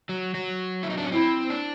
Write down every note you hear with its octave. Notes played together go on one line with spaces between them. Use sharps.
F#3
F#3
E4
D#4
D4
C#4
C4 E4
D4